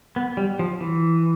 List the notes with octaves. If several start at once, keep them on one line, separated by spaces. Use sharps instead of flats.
B3
G3
F3
E3